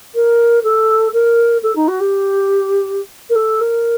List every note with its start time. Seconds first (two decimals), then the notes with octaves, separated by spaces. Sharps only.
0.15 A#4
0.64 A4
1.13 A#4
1.63 A4
1.75 D#4
1.88 F#4
2.00 G4
3.30 A#4
3.35 A4
3.61 A#4